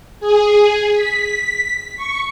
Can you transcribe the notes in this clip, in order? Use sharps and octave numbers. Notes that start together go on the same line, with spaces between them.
G#4
B6
C#6